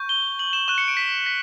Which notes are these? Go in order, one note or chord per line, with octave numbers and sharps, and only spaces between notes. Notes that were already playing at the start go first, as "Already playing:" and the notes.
Already playing: C#6 G6
G7
F#7
E7
C#6 F#6 E7
C#7
D7
B6
B6